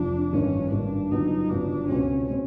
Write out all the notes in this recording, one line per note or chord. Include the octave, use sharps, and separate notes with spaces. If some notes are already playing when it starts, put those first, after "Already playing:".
Already playing: F1 F2 C3 F3 D4
G#1 G2 D#3 C#4
G#1 G2 D#3 D4
G1 F#2 C#3 F#3 B3 D#4
G1 F#2 C#3 F#3 B3 D4
C#2 B2 G#3 C4 C#4
B2 G#3 C4